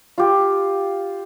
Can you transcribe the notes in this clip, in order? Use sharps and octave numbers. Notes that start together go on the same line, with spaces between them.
F4 G4